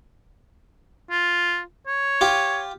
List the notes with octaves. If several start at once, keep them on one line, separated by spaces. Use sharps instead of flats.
F4
C#5
F4 G4